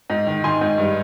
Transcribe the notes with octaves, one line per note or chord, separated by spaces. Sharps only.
G#2
D#3
D#3 G#5 C6
G#2
G2